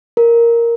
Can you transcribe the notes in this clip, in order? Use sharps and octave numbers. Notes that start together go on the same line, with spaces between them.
A#4